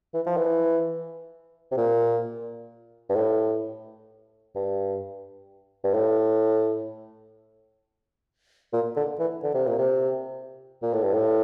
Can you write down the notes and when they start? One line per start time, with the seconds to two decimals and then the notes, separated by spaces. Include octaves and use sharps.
0.14 E3
0.26 F3
0.37 E3
1.71 C3
1.77 A#2
3.09 G2
3.15 A2
4.55 G2
5.84 G2
5.94 A2
8.73 A#2
8.96 D3
9.19 E3
9.43 D3
9.54 C3
9.67 A#2
9.78 C3
10.82 A#2
10.93 A2
11.03 G2
11.14 A2